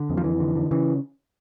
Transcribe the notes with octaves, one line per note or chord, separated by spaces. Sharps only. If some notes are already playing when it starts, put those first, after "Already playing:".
Already playing: D3
F2
F3
F2 E3
D3
D3
C#3 E3